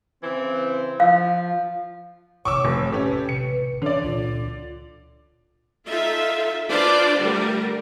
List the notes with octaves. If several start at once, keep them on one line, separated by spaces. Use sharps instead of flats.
C#3 E3 C4
F3 F5
A1 C3 C#5 C#6 D6 E6
F1
C#4 G4 A4 B4
A1 C3 C#7
D3 E3 C#5 D5
C#2 A#2 F4
D#4 F4 A4 E5
D4 F4 B4 C5 D5
D3 G3 A3 A#4